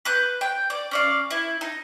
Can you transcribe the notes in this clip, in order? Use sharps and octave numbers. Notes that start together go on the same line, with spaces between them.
B4 F#6 G6
G5
D5
C#4 D5 F5
E4
D#4